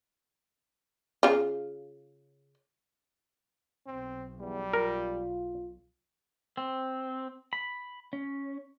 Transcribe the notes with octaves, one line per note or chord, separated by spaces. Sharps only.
C#3 F4
B1 C4
E2 G3
F4 A#4
C4
B5
C#4